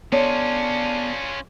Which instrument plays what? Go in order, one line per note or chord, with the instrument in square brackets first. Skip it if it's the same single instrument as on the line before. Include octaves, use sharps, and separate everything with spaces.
[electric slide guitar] B3 A4 D5 [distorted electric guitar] C#4 F4 [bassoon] D4 [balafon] C#5